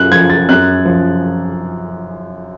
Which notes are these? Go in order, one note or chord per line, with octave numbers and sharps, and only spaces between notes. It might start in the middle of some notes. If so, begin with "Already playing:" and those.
Already playing: F#2 F#6
F3 G#6
A6
F#2 F#6
F3